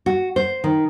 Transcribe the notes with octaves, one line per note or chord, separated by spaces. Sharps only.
F#4
C5
D#3